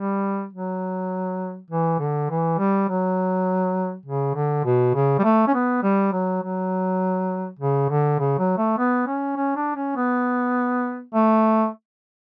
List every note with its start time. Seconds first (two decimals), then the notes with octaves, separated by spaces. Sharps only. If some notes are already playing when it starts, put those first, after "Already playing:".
Already playing: G3
0.53 F#3
1.70 E3
2.00 D3
2.30 E3
2.58 G3
2.89 F#3
4.06 C#3
4.35 D3
4.65 B2
4.95 C#3
5.19 G3
5.24 A3
5.47 C#4
5.54 B3
5.83 G3
6.13 F#3
6.42 F#3
7.59 C#3
7.90 D3
8.19 C#3
8.39 F#3
8.58 A3
8.78 B3
9.07 C#4
9.36 C#4
9.56 D4
9.76 C#4
9.96 B3
11.14 A3